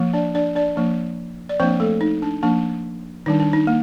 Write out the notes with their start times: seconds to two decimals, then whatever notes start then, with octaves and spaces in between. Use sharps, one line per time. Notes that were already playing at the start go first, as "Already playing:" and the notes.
Already playing: F3 A#3
0.13 D4 D5
0.35 D4 D5
0.55 D4 D5
0.76 F3 A#3 D4
1.49 D5
1.60 F3 A#3 C4 D4 C5
1.80 A3 A4
2.01 D#4
2.22 D4
2.43 F3 A#3 D4
3.26 D#3 G3 D4 D#4
3.40 D4
3.53 D#4
3.67 A#3